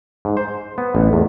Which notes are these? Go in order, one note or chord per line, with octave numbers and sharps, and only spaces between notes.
G#2
C5
B3
A1
E2